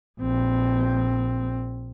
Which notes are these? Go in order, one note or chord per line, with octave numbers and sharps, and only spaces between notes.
A#1 C4